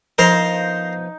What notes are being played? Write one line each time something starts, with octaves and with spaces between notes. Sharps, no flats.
F3 B3 D#4 A#4 C5 F5 A#5